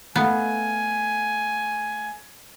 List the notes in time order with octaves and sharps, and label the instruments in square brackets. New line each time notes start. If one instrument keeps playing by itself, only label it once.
[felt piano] A3 A4 F5 [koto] B3 [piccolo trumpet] G#5